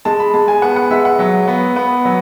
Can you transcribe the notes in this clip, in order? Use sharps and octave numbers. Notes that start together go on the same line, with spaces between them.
G#3 A5
B5
G#3 A5
G#5
B3 F#5
F#5
G#3 E5
F#5
F#3
B3
B3
F#3